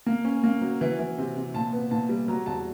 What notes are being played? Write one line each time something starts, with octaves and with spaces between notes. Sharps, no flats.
A#3
C#4
A#3
F#3
E3
E3
C3
C3
A#2 A5
B3
A#2 A5
G3
F#3 A#5
E2 A5